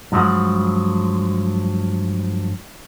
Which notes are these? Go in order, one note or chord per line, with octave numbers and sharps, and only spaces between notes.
G2 F3 F#3 G#3 F#5